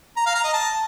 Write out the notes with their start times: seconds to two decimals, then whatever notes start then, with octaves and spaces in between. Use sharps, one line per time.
0.17 A#5
0.26 F5
0.35 A#5
0.44 D#5
0.54 A5